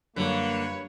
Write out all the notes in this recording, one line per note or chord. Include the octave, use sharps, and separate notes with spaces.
F#2 D3 G3 A#3 F4 B4 C#5